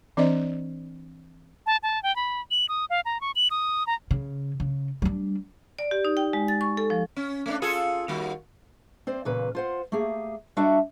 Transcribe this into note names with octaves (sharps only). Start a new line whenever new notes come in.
E3 C4 D4 C5 D5 D#5
A5
A5
G5
B5
F#7
D#6
F5
A#5
C#6
F#7
D#6
A#5
C#3
C#3
G3 D4
D5
G4
D#4
G5
G#3
A6
C#6
A4
F3
C#4
A3 A#3 D4
F4 G#4 A4
D#2 G3 F#4
C4 C5 D5
E2 A#2 C#3 A#3 B4
F4 C5 F#5
A3 A#3 G4 G#4
G3 D4 F#4 D#5 E5 F#5